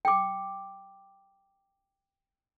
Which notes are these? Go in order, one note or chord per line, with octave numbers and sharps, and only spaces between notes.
G5 D6